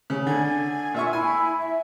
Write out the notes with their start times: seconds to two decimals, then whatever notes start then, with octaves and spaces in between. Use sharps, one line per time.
0.10 C#3
0.27 D3 G#5
0.94 A#2 E5 C#6
1.13 E4 G#5
1.60 E5